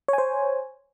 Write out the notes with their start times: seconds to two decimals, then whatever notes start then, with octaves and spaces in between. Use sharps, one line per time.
0.08 C#5
0.13 G#5
0.18 C5